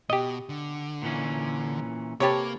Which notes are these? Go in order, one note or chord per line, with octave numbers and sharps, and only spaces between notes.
B2 G4 D#5
D3
A#2 E3 C#4
C3 A#3 G4 A4 B4 C#5